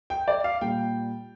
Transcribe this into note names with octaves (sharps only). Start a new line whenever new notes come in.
G5
D5
F5
A#2 G3 G5